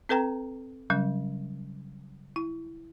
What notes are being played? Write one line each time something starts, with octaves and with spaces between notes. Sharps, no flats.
C4 A4 B4 G5 A#5
C#3 F#3 G3 C#4
E4